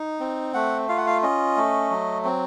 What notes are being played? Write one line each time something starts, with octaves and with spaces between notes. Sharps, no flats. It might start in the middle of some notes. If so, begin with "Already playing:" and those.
Already playing: D#4
C4
A3 F#5
F4 F5
F#5
F5
C#4 D#5
A3
F#3
C4